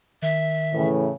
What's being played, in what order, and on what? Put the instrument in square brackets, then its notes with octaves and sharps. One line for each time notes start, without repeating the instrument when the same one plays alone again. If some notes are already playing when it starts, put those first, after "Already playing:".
[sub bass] D#3 [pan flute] E5
[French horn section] A2 C#3 E3